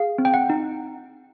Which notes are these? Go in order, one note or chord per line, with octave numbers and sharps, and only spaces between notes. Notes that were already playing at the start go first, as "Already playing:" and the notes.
Already playing: G#4 F5
C4
G5
F#5
D#4